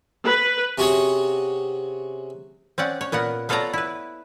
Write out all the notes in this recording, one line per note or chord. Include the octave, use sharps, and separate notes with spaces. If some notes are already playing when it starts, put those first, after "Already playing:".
B4
C3 C#4 F#4 G#4 C#5
C4 C#4 D5 F#5
C#5
A#2 B3 A#4 F#5
B3 F4 A4 C#5 D5 A#5
E4 B4